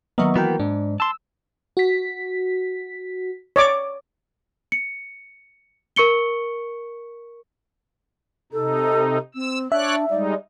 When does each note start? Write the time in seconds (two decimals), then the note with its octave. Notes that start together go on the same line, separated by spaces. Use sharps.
0.18 D#3 F#3 A#3 B3 D#5 E5
0.36 E3 B3 F#4 A#4 G5
0.60 G#2 D4
1.00 A5 C6 E6
1.77 F#4 B6
3.56 C#5 D5 D6
4.72 C#7
5.96 A#4 C#6 C#7 G7
8.53 C3 D#4 A4
9.35 C4 E6
9.72 D4 C#5 D5 E5 F#6
10.10 G3 G#3 D#4 D5